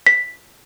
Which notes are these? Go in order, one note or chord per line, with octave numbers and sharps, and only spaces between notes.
B6